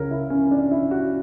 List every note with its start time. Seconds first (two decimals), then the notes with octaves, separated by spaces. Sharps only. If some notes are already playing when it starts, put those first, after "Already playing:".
Already playing: C#2 C#3 A#4 C#5
0.11 E4
0.30 C#4
0.51 D4
0.71 E4
0.91 F#4